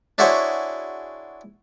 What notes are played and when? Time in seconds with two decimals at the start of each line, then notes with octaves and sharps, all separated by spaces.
0.18 D4 E4 F#4 G#4 C5 C#5